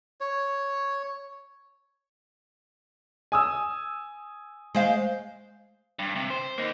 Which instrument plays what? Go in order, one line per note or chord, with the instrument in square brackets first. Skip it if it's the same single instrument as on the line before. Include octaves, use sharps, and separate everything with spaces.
[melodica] C#5
[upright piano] G#5 D#6 E6
[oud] G#3 C5 F5
[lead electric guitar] G2
C3
C5
A#3 D#4